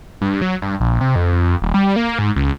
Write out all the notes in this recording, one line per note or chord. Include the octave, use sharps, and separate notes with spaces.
G2
F#3
G2
A#1
C3
F2
F2
D#1
G3
A#3
G#2
C#2